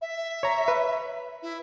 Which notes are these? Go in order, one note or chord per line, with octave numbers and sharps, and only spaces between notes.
E5
C#5 A#5
B4
E4